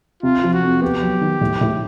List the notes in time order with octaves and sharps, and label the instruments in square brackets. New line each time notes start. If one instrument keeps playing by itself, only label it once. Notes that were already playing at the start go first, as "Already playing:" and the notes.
[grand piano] C3 [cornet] F4
[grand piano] F3
[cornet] F#4
[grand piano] F2
[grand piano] B3 [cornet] G4
[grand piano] F#3
D#3
A2
A2